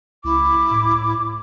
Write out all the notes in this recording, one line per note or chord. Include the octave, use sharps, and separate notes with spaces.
C#2 E4 D6
A2